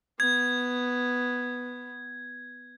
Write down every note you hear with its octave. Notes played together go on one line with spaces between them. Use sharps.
B3 G#6